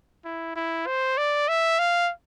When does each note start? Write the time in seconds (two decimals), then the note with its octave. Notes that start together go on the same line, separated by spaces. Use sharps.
0.25 E4
0.56 E4
0.87 C5
1.18 D5
1.49 E5
1.79 F5